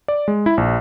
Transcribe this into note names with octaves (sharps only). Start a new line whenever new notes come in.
D5
G#3
E4
A#1